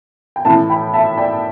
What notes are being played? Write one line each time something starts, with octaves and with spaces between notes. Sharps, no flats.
G5
A2 E3 E5 A5
G5 B5
E5 A5
D5 G5